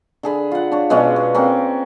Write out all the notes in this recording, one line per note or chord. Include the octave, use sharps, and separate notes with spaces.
D3 G#4 B5
F4 F#5
D4 C#5
B2 G#3 C#4 D4
B2
A#3 C4 C#4 A#4